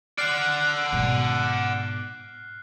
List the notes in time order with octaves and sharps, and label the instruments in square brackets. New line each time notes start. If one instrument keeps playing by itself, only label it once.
[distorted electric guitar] D5 F#5 [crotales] F6 F#6 C7
[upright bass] G#2 B2